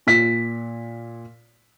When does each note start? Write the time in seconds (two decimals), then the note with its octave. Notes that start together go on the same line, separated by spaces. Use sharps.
0.07 A#2 B6